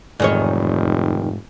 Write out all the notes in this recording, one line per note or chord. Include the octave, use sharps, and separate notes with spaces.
F1 E2 G#2 D#3 C#5